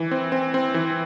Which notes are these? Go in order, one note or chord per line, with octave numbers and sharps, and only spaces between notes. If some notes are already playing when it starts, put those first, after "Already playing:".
Already playing: E3
C4
C4
C4
E3